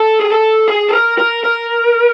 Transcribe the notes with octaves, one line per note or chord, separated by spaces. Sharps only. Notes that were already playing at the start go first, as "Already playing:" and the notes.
Already playing: A4
G#4
A4
G#4
A4
A#4
A#4
A#4